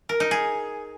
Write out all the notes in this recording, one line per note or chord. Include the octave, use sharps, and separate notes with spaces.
A#4
D#4
G#4